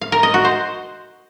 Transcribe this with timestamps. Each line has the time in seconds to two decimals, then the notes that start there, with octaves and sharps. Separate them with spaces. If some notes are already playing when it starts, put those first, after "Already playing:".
0.01 F5
0.12 A#4
0.23 D#5
0.34 F#4
0.45 C5